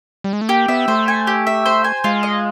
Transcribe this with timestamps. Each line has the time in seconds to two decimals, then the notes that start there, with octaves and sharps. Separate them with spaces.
0.24 G3
0.33 G#3
0.41 A3
0.49 A#3 G4
0.68 B3 E5
0.88 A3 C5
1.08 G#5
1.27 G4
1.47 E5
1.66 C5
1.84 G#5
2.04 G#3 F4
2.23 D#5